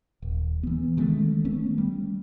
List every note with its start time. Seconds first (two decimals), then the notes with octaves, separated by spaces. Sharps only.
0.22 D#1
0.63 E3 B3
0.97 D#3 G#3 A3 C#4
1.45 D#3 A3 B3 C#4
1.78 G3